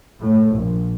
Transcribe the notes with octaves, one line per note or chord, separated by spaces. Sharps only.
A2
A#1